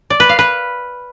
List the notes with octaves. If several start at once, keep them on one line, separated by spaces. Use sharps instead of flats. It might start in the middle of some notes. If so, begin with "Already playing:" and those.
D5
B4
F5
B4